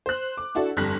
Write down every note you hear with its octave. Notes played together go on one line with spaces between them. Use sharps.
C5 F#6
D6
D4 E4 F#4 A4 D5
G1 F2 G3 F#6 A#6 B6